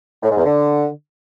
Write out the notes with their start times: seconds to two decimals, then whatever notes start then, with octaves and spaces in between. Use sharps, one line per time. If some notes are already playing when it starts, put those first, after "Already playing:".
0.23 A2
0.30 G#2
0.37 E2
0.45 D3